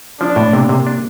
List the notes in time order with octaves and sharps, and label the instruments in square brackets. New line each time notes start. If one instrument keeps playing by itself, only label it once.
[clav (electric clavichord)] F3 [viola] D4
[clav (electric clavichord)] A2
[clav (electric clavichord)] C3 [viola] A#3
[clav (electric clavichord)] C3
D4